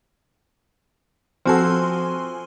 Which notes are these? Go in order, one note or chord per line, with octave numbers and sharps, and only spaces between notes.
F3 C4 F#4 A4 G#5 C6